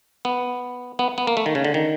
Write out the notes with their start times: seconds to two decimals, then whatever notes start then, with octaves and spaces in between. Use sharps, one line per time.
0.25 B3
0.99 B3
1.18 B3
1.27 A#3
1.37 A3
1.46 D#3
1.55 C#3
1.65 D3
1.74 D#3